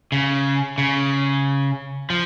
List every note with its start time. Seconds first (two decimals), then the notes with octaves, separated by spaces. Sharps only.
0.12 C#3
0.78 C#3
2.10 F3